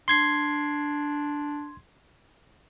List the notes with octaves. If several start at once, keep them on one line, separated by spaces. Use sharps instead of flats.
D4 C6 G#6 C7